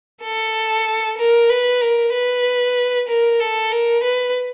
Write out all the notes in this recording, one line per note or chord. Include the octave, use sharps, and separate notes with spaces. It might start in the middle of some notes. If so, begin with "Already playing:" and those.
A4
A#4
B4
A#4
B4
A#4
A4
A#4
B4